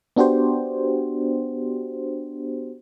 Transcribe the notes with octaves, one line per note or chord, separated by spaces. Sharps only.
B3 D4 F#4 G4 C5